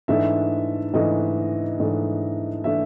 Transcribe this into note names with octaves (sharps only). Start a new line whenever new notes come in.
G#2 E3 A3 D4 E5
G#2 E3 A3 D4 D#5
G#2 E3 A3 D4
E3 A3 D4 E5